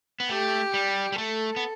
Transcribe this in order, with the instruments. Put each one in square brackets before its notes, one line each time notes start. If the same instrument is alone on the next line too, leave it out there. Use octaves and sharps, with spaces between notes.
[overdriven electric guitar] B3
[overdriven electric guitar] A3 [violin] G4
[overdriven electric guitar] G3
G3
[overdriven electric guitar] A3 [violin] A4
[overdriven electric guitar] B3